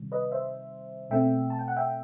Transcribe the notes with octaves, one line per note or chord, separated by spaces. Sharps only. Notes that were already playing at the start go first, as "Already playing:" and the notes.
Already playing: C3 D#3 G3
B4 D#5
C5 E5
B2 A3 C4 E5 G5
A5
G5
F#5
E5 G5